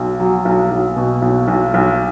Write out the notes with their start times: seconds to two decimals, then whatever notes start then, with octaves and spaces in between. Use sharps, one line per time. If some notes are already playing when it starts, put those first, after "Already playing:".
Already playing: B1
0.20 F#3
0.45 B1
0.71 B1
0.96 B2
1.22 B1
1.48 B1
1.74 B1